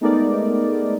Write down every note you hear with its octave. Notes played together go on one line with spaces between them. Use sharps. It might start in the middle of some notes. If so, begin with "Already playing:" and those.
G#3 A3 B3 D#4 A#4 D5